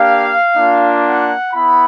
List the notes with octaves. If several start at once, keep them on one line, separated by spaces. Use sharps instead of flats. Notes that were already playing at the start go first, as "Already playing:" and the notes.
Already playing: A#3 D4 G4 F5
A#3 D4 F4
F#5
B3 E4 B5